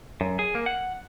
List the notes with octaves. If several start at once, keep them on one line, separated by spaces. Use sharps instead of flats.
F#2
G#4
A#3
F#5